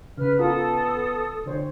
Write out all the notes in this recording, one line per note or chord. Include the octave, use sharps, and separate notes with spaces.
C#3 B4 F6
B3 F4 A4 A#4 D#6
D3 C5 C#5